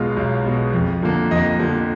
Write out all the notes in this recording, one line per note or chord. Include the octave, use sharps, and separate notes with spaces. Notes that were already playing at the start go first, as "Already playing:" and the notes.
Already playing: B1 B2 G#3 F4 F5
B1
B2 G#3
F2
D3 F3 A#3
F2 D#5
D3 F3 A#3